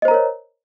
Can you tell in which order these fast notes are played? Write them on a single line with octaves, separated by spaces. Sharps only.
D#5 C5 A#5 A#4 C#5